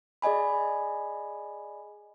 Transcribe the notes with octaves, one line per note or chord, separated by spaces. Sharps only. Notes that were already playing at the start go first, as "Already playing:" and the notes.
G#4 D5 D#5 G#5 B5